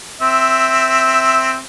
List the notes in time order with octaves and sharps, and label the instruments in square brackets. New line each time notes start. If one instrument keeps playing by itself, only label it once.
[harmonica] C4 E5